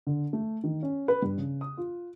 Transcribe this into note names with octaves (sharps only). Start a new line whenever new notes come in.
D3
A3
D#3
C#4
B4
G2
C#3
D#6
F4